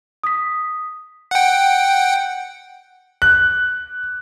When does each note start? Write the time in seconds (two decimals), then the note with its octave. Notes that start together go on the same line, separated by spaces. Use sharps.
0.24 D#6 B6
1.31 F#5 G5
3.22 F#6